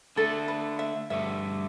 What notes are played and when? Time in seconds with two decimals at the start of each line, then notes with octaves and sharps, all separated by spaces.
0.16 D3 A3 D4 A4
0.48 B4
0.79 E5
1.10 G2 D3 A3 E5